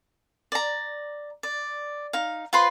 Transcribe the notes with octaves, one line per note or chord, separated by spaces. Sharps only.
D5 A#5
D5
D#4 F5
F4 B4 C5 C6